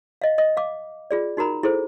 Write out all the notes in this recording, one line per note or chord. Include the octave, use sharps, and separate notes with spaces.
D#5 F5
D#5 D#6
F5 D6
F4 G#4 D5
D#4 F#4 A#4 A#5 B5
E4 G#4 A4 C5